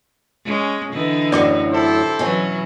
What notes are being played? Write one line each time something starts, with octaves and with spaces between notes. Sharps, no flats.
G#3 C#4
D3 E3 D#4
F#2 A2 F#3 D5 D6
E4 G4 A4 C5
B2 E3 F#3 C#4